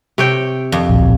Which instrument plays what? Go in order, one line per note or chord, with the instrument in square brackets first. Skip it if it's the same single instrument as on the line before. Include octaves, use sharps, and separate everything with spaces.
[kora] C3 C#5 G5
[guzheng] F2
[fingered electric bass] D1 A#1